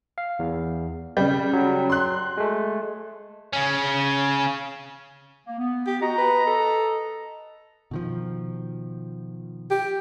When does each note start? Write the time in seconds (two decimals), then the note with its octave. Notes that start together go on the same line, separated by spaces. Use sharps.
0.18 F5
0.39 E2
1.17 C#3 G3 G6
1.53 F#3
1.90 C6 F#6
2.37 G#3 A3
3.53 C#3 C#4
5.47 A#3
5.59 B3
5.87 G4
6.02 F#4 D#5 A#5
6.18 B4
6.47 A4
7.91 B2 D#3 F3
9.70 G4